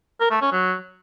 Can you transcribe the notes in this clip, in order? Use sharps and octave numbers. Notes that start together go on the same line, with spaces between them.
A#4
A3
C#4
F#3